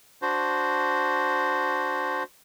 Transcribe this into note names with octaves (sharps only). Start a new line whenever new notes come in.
D4 F#4 C5